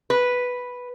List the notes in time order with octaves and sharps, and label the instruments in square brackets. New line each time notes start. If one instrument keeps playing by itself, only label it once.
[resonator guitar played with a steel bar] B4